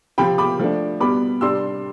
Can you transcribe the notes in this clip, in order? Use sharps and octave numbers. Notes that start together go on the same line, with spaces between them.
C3 F3 C4 G5 B5
B5 D6
F3 A3 D4
B2 G3 B3 B5 D6
C3 G3 D4 C6 E6